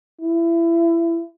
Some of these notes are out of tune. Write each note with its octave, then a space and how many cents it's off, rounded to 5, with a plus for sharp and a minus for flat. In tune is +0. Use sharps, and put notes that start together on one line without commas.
E4 +25